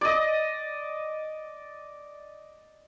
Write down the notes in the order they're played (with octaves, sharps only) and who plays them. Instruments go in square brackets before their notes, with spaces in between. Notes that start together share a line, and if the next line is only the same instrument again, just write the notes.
[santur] D5 D#5